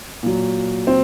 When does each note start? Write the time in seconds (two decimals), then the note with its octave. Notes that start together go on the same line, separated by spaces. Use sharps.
0.23 A#2 F#3
0.87 C4